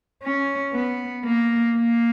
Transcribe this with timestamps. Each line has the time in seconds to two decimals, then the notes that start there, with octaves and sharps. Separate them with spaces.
0.23 C#4
0.73 B3
1.25 A#3
1.77 A#3